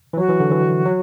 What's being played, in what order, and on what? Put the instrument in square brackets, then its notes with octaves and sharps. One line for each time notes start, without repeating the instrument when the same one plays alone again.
[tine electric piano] E3
[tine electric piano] F#3 [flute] F#4
[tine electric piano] E3
D3
E3
F#3